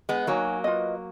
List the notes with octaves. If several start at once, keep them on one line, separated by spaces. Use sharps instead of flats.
G#3 B3
F#3 A#3 D#4 F#4 C#5 G#5
F4 B4 D#5